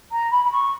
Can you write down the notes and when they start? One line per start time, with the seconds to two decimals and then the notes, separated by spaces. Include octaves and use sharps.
0.11 A#5
0.31 B5
0.45 B5
0.52 C#6